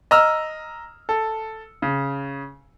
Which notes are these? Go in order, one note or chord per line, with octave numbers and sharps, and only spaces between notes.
D#5 A#5 E6 F6
A4
C#3